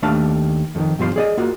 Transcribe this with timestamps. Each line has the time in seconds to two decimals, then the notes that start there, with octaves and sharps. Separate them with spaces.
0.02 D#2 A3 D4 F5 A5
0.75 F2 D#3
0.99 G2 B2 F3 C6
1.16 G#4 D5 D#5
1.37 A#3 F4 F#4